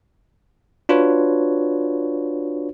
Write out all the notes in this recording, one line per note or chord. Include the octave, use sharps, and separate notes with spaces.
D4 F4 F#4 B4 C#5